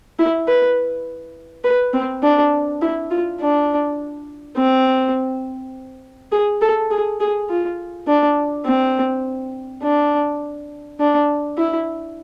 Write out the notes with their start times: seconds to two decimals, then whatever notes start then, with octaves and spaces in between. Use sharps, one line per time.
0.19 E4
0.48 B4
1.64 B4
1.94 C4
2.23 D4
2.82 E4
3.11 F4
3.41 D4
4.57 C4
6.32 G#4
6.61 A4
6.91 G#4
7.20 G#4
7.50 F4
8.07 D4
8.66 C4
9.82 D4
11.00 D4
11.58 E4